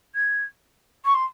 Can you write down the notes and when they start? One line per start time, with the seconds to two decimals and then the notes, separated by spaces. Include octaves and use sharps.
0.15 G#6
1.04 C#6
1.14 C6